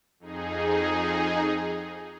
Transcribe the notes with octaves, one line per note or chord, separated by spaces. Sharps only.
F2 D#4 G#4